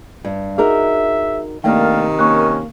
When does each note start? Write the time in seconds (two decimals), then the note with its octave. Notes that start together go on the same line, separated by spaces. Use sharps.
0.25 G2
0.58 D#4 F#4 G#4 A#4 E5
1.64 C3 D#3 A3 A#3 D4 F5 G5 F6
2.19 A#3 C#4 C#6 F#6